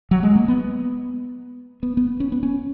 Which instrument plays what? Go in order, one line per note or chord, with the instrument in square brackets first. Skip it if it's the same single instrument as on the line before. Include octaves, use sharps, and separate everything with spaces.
[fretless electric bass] F#3
G#3
A#3
B3
B3
B3
C#4
B3
C#4